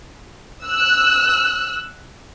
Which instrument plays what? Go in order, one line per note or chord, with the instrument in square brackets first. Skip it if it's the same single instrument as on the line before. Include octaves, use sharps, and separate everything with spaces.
[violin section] E6 F#6